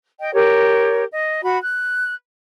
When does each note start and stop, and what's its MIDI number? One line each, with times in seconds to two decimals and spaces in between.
0.20 0.34 75
0.20 0.34 79
0.34 1.03 67
0.34 1.03 70
0.34 1.03 73
1.12 1.40 75
1.43 1.57 66
1.43 1.57 83
1.62 2.13 90